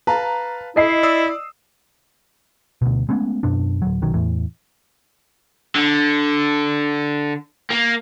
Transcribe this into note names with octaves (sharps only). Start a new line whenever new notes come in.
B4 F5 A5 A#5
E4 D#5 C7
D5 D#6 E6
D2 B2
G#3 A3 B3 C#4
F#2 B2 D4
D1 F#3
B1 D#3 F#3
E2 A2 E3
D3
A#3